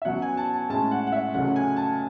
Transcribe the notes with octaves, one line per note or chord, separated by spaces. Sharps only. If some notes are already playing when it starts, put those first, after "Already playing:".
E5
B2 F#3 C#4 F#5
G#5
A5
A5
A2 G#3 C#4 A5
F#5
F#5
E5
C#2 C#3 F#3 A3 C#4 F#5
G#5
A5